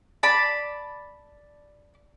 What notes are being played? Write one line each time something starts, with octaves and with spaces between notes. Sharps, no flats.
D5 A5 B5